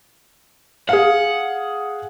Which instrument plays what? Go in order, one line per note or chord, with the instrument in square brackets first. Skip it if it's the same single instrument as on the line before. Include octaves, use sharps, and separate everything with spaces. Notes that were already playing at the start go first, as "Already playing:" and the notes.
[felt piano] G#4 F5 [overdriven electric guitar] F#5